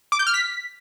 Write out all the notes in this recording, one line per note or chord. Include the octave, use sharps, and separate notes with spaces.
D6
G6
F6
B6